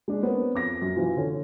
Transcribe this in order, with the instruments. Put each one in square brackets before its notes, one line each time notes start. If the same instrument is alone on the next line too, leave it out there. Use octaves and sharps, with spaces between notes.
[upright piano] G#3 D4
B3 C4 A#4 C#5
F2 D6 A#6
F#2
B2 E3 F3
D3 C#4